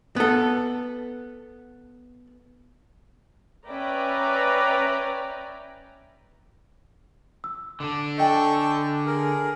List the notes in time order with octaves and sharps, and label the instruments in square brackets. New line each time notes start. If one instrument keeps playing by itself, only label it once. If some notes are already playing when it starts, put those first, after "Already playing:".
[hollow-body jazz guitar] B3 A4
[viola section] C#4 B4 D5 E5 G5 A#5
[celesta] E6
[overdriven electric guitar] D3 D4
[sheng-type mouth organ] A4 C#6 G6 [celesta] D#5 G5 G#5
[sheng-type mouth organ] G#4 A#4